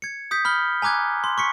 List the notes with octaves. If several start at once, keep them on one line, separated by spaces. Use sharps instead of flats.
G#6 C#7
D#6 G6 B6
B5 F6 G7
G#5 A#5 D6 F#6 G#6
C6
C#6 B6 C#7